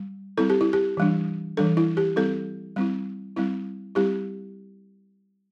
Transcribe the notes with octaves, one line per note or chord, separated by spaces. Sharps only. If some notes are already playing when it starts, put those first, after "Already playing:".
Already playing: G3
G3 C4 E4 A4
G4
E4
G4
E3 G3 D4
E3 G3 D4 A4
E4
G4
G3 C4 E4 A4
G3 C4 E4
G3 C4 E4
G3 C4 E4 G4